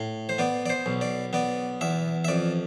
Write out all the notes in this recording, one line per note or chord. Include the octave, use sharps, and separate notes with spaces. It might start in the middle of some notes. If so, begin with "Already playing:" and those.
Already playing: A2
C5
B3 D5
D5
C5
B1
D5
B3 D5
E2 E5
E5
F2 D5